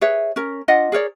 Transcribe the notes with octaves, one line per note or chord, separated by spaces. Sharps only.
G#4 B4 C#5 E5
C#4 A#4
D4 F4 D#5 F#5
G#4 A#4 C#5 D5